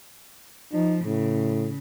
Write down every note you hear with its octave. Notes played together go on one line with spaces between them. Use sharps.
F3 D#4
A2 C#3